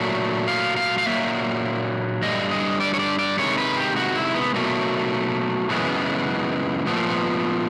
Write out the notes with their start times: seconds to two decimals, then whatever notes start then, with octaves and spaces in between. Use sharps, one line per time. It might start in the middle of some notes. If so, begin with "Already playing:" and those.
Already playing: A#2 F#3 A3
0.48 F5
0.77 F5
0.98 F5
1.06 A#2 F#3 A#3 E5
2.22 G2 D3 G3 D#5
2.51 D#5
2.80 D5
2.94 C#5
2.99 D5
3.19 D5
3.38 C3 D#3 G#3 C#5
3.58 B4
3.77 G4
3.96 F#4
4.16 E4
4.35 B3
4.54 B2 F#3 A3 A#3
5.70 F#2 C#3 E3 G#3 B3
6.86 A#2 F3 A3 B3
6.97 A#3
7.07 B3